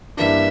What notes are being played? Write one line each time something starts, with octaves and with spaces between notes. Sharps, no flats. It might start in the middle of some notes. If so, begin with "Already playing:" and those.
G2 E3 A#3 D4 E5